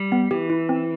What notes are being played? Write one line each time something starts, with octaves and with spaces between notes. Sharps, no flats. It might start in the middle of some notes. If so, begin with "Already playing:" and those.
Already playing: G3
B3
E3 G4
E4
C4